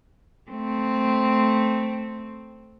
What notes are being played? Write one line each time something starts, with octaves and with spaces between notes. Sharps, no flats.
A3 C4